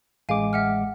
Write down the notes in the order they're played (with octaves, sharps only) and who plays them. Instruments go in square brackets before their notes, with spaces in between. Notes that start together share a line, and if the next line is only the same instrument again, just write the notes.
[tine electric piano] A1 G#3 D6 [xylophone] F5 G#5
[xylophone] E5 F#5 F6